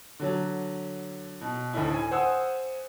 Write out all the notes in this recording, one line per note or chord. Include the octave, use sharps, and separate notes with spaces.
D3 F#3
B2
D2 A2 D#4 E4
G#5
C5 F#5 G#5 D#6 E6